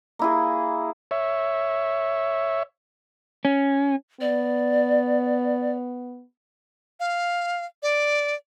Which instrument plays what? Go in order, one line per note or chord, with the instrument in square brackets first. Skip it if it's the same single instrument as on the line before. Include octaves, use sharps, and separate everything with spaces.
[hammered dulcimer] A#3 E4 G#4
[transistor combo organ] C#5 E5
[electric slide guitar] C#4
[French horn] B3 [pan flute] D5
[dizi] F5
D5